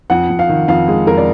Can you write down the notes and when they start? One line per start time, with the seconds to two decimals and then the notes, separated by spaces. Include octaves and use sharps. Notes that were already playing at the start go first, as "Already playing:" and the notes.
0.10 F2 F#5
0.30 F2
0.39 F5
0.49 D#3
0.68 F2 F5
0.88 G#3 G#4
1.07 F2 A#4
1.17 D5